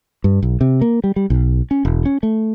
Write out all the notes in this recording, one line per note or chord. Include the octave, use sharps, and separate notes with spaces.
G2
B1
C3
A#3
G3
G3
B1
C#4
E1
C#4
A3